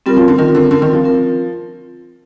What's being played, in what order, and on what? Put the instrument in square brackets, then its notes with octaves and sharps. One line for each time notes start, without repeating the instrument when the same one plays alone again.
[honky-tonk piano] G3 [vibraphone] C4 F4 A#4
[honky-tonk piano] F3
D3
[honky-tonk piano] D#3 [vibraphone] C4 F4 A#4
[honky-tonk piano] D3
[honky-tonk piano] D3 [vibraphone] C4 F4 A#4
[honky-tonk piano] D#3
F3
[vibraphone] C4 F4 A#4